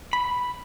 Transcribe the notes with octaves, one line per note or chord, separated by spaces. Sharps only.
B5